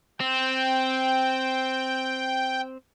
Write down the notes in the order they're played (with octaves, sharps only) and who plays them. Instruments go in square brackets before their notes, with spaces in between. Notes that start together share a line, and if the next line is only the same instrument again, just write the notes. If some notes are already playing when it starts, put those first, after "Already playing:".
[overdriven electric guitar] C4 [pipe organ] G5